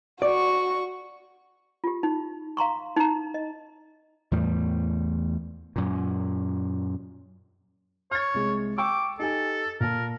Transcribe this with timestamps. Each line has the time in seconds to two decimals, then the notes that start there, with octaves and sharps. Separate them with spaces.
0.22 F#4 D5 C#6
1.84 F4 G4
2.03 D#4
2.57 F5 A#5 C6 C#6
2.96 D#4 A#5
3.34 D#5
4.31 E2 A2 G3
5.76 F#2 A#2
8.11 C#5 F6 A6
8.34 C2 G#3
8.78 G5 C#6 D6 E6
9.19 D#4 G4 A4 G#5
9.80 A#2 A#4 A5